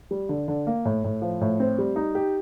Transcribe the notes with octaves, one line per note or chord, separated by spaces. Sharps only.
G3
D3
D3
A#3
A2
A2
F3
A2
C4
G3
D#4
G4